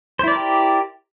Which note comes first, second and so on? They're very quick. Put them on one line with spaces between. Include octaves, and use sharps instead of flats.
C5 E4 D5 A#4 G4